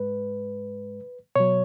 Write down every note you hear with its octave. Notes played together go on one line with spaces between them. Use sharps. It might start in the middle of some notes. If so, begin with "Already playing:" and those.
Already playing: G#2 G#3 B4
B2 F#3 C#5